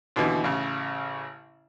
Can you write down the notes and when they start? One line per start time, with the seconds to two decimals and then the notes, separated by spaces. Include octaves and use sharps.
0.16 D#2 B2 D3 E3
0.44 A1 C#3